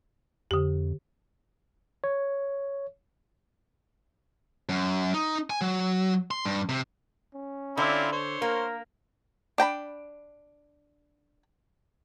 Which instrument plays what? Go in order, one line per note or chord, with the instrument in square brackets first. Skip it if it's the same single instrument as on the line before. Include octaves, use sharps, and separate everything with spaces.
[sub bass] F2 [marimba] D3 G4
[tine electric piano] C#5
[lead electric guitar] F#2
D#4
G#5
F#3
C6
G2
C3
[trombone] C#4
[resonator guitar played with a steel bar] D3 [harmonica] C4 E4 F4
[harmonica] C5 C#5
[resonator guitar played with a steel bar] A#3 [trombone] A#4
[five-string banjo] D4 G5 A#5 B5